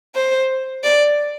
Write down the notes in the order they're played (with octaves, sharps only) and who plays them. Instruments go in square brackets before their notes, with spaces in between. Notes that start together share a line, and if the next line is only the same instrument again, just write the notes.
[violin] C5
D5